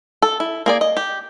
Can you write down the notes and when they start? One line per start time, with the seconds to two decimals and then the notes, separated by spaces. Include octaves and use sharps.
0.22 A4
0.40 E4
0.66 A#3 G#4 D5
0.81 D#5
0.97 G4